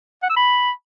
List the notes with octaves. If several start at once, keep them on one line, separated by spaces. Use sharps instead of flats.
F#5
E6
B5